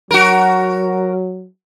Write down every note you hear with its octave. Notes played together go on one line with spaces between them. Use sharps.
F#3 F#4 A#4